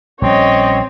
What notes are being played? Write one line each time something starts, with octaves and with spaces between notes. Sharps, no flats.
A#1 G3 C4 C#4 C#5 D#5